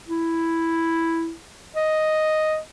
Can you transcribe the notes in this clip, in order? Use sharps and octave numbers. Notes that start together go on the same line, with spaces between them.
E4
D#5